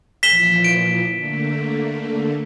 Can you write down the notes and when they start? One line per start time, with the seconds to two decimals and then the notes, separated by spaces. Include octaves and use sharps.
0.23 A#2 E3 F3 B6 E7 G7
0.64 D7
1.13 D3 A3 A#3